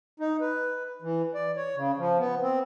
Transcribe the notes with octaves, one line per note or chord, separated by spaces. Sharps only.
D#4
B4
E3
D5
C#5
C#3
F3
B3
C4